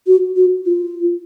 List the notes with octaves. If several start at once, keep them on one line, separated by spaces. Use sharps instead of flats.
F#4
F#4
F4